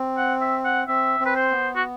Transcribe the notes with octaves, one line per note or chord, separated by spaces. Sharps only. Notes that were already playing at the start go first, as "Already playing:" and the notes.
Already playing: C4
F#5
E5
F#5
C4 E5
C4
B4
C5
B3
F#4